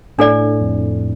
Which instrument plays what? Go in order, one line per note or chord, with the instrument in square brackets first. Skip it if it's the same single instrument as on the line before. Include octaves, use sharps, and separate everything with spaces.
[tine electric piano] A2 [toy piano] D4 A4 D5
[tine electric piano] F2